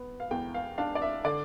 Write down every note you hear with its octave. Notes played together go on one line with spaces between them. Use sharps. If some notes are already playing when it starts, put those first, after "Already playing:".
Already playing: B3
F5
E2 G5
F5
D4 F5
D5
E5
D3 D5